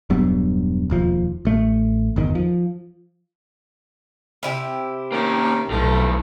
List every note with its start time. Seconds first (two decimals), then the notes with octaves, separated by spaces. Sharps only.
0.10 E1 G2 F#3 B3
0.90 E1 D#2 F3
1.45 A1 A3
2.16 G1 E2 D#3
2.35 F3
4.43 C3 E4 G4
5.12 D#3 A#3 C#4
5.71 B1 D#3 F3 A3